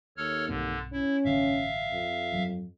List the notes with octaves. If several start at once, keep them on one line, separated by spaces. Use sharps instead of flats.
D#2 A4 C#5 F6
B1 G2 D3 C4
C#4 E4
A1 G2 D3 E5 F5
F2
G2 F#3